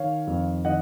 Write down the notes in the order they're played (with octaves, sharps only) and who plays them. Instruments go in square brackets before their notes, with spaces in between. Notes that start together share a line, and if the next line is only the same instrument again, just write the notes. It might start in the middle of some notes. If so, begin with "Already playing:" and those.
Already playing: [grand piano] D#3 C#5 F5
F2
D#3 D#5 F#5